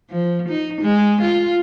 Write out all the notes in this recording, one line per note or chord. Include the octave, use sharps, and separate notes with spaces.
F3
D#4
G#3
F4